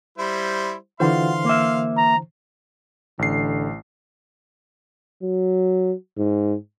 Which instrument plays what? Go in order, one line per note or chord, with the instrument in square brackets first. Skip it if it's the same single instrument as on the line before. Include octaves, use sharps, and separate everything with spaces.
[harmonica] G3 E4 C5
[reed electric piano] D3 E3 C5 [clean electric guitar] F4 F#4 [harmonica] F5 C6
[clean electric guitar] A#3 E5
[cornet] A#5
[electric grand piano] A1 C7 [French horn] D3
[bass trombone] F#3
G#2